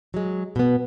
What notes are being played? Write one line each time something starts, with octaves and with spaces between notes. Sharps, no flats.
F#3 G#3
B2 B3